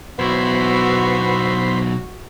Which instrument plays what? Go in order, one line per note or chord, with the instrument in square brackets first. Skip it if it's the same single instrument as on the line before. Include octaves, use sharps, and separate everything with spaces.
[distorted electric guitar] B1 E4 [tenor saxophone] B3 [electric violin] F#4 [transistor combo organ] C5 B5